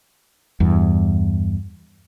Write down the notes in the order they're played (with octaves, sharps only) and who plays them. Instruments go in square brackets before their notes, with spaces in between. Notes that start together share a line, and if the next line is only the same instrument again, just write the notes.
[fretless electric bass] E2 G2